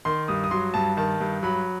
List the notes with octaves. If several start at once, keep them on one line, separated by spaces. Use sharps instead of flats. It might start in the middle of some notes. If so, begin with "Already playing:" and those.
D#3 C6
G2 D#6
D#6
F#3 C6
G2 A5
D#3 A5
G2
F#3 B5